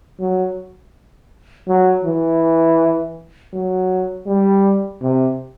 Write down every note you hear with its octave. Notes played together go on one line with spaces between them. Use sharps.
F#3
F#3
E3
F#3
G3
C3